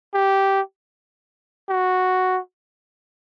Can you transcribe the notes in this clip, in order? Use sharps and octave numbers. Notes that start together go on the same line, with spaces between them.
G4
F#4